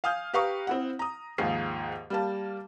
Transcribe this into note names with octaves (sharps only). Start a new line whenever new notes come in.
F5 G#5 D#6 F6 G6
G4 B4 F5 A#5 C#6 D#6
C4 E4 F#5
A#5 D#6
D#2 G#2 F3 G#4 C7
G3 A#3 A5